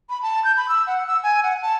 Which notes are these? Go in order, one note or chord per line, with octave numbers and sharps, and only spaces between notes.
B5
A5
G6
B5
E6
F#5
E6
G#5
F#5
A5